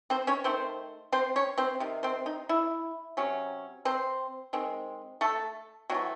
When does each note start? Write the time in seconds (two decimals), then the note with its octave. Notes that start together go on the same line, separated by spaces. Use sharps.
0.10 C4 C5
0.27 C#4 C#5
0.44 D#3 A3 C4 C5
1.12 C4 C5
1.36 C#4 C#5
1.58 C4 C5
1.80 C3 D#3
2.03 C4 C5
2.26 D#4
2.49 E4
3.17 C3 F#3 C#4
3.85 C4 C5
4.53 D#3 G#3 C4
5.21 A3 A4
5.90 E3 F#3 A3 C4 F#4